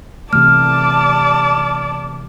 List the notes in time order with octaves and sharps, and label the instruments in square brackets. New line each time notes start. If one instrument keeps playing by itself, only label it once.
[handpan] C3 E3 A3 [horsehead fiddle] D5 A5 [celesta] F6